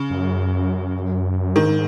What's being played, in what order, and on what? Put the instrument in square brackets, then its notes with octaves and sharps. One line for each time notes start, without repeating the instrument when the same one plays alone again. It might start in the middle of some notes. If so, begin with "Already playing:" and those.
Already playing: [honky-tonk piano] C#3
[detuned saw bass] F#2
[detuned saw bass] G#2 [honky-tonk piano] D#3